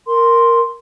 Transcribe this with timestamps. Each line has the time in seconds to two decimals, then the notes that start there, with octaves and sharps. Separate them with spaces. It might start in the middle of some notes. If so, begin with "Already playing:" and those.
0.06 A#4 C6